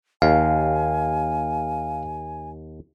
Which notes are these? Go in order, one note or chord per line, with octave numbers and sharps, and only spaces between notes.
D#2 F5 G#5